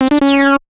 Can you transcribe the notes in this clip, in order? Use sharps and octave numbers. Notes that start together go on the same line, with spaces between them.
C4
D4
C#4